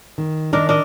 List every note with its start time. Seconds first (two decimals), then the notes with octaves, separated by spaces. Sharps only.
0.18 D#3
0.53 D#3 D4 D#4 A#4
0.69 D4 A#4 D#5